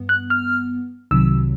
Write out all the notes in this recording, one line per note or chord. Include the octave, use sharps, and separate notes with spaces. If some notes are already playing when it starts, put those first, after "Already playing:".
Already playing: G2 B3
F#6
F6
C2 C3 D#3 F#3 E6